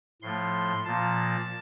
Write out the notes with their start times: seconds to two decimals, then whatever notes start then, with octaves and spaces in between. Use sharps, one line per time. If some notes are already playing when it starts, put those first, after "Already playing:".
0.22 A2 F3 A3 C6
0.85 A#2 F3 A#3 A5